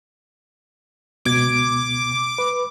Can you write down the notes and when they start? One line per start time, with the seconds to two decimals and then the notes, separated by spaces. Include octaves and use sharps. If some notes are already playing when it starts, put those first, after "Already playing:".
1.25 C#2 B2 D6 G#6
2.38 B4